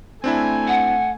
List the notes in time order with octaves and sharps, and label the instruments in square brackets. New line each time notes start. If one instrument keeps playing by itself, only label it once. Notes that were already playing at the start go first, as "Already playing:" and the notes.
[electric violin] A3 G#5 [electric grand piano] C4 D4 E4
[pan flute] F#5